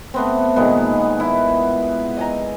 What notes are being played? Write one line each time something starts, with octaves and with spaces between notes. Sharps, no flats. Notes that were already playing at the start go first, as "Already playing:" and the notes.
A3 B3 C4
A#2 D#3 G#3 B3
E4
D#5 G#5 A#5